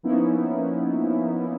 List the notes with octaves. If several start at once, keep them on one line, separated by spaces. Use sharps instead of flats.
F3 A#3 B3 C#4 D#4 E4